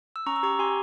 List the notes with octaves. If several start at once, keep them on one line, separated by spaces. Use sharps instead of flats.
E6
C#4 A#5 C#6
E6
G4 A#5 C#6
G4 G#5 C6